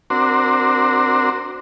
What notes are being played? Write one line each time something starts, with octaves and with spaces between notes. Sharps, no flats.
C4 D4 F#4 A#4 C5